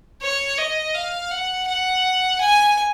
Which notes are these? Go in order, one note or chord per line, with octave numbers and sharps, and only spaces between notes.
C#5
D#5
F5
F#5
F#5
G#5